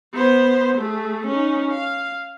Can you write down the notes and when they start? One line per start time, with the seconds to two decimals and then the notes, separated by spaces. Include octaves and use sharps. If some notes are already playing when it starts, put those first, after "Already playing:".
0.14 B3 C5
0.78 A3 G#4
1.27 C#4 D#4
1.72 F5